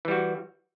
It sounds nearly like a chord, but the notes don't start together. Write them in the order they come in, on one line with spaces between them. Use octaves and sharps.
E3 G3 F#4